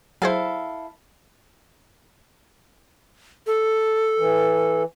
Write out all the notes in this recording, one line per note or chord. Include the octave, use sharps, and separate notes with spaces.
F#3 E4 G#4 A4 C5 F5
A4
E3